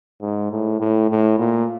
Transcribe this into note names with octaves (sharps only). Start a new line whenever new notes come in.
G#2
A2
A2
A2
A#2